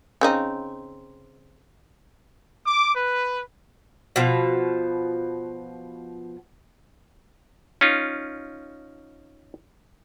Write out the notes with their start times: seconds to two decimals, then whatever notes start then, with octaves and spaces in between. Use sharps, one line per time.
0.21 C#3 C4 D#4
2.65 D6
2.95 B4
4.16 B2 F3
7.81 C#4 D#4 F4